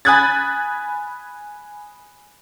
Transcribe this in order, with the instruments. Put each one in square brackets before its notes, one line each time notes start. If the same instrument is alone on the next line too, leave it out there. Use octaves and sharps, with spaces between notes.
[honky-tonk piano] G#5 B5 D#6 F#6 G#6 A6